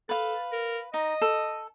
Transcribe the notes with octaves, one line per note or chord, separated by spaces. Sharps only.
A4 B4 F5
A#4
D#4 D#5
A4